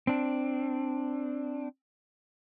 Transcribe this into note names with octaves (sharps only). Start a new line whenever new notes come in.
C4 D4